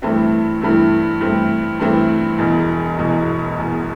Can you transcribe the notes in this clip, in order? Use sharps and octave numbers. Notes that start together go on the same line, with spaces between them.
G2 E3 A3 C4 E4
G2 E3 A3 C4 E4
G2 E3 A3 C4 E4
G2 E3 A3 C4 E4
E1 E2 B2
E1 E2 B2
E1 E2 B2